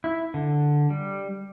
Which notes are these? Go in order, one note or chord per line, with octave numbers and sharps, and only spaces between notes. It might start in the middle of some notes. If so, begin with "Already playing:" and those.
E4
D3
G3